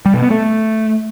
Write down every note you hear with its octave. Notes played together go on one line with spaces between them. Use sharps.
G3
B2
B3
A3